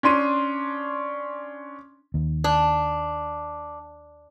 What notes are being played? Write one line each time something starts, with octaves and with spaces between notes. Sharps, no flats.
C#4 D4 C6 D#7
D#2
D4